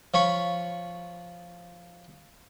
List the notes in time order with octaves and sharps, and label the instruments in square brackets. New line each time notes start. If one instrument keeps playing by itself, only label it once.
[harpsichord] F3 C#5 B5 C#6